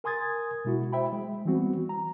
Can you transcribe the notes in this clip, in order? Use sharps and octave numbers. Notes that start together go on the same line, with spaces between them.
A#4 G#5 C6 D#6 G#6 A6
B2 G#3 E4 F#4
C5 E5 G5 B5
G#3
E3 G3 B3 C4 F#4
A#5